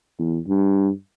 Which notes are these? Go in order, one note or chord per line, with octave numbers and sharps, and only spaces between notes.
E2
G2